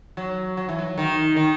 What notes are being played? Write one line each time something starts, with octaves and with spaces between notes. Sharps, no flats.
F#3
F#3
E3
F#3
D#3
D#3